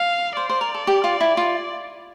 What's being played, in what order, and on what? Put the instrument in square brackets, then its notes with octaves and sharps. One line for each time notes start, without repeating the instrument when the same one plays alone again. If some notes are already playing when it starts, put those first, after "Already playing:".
Already playing: [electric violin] F5
[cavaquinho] C5 [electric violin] D5
[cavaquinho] C5
A#4
A4
G4
F4
E4
F4